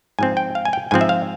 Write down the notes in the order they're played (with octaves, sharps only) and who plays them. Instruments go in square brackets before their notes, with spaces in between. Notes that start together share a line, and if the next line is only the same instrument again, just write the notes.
[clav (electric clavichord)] G#2 F3 C4 G#5
G5
F5
G#5
G5
G#2 F3 C4 G#5
E5
F5